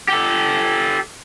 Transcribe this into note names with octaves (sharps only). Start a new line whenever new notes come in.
G4 A4